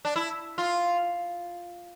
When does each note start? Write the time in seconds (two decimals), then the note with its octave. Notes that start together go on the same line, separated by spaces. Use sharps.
0.05 D4
0.16 E4
0.58 F4